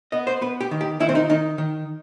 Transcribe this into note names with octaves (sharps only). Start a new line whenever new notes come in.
B3 D#5
C5
B3 B4
G4
D#3
G4
D#3 E4
C4
D#4
D#3 D#4
D#3